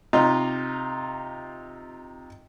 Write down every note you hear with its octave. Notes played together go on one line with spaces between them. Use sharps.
C3 D#4 F4